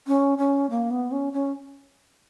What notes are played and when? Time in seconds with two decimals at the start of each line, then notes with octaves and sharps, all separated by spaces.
0.07 C#4
0.38 C#4
0.70 A#3
0.90 B3
1.12 C#4
1.33 C#4